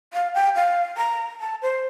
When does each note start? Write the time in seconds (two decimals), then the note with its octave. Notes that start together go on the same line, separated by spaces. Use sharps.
0.13 F5
0.34 G5
0.56 F5
0.97 A#5
1.40 A5
1.62 C5